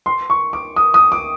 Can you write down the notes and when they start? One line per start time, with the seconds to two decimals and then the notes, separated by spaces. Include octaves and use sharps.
0.06 C6
0.30 C#6
0.53 D6
0.76 D#6
0.94 D#6
1.12 D6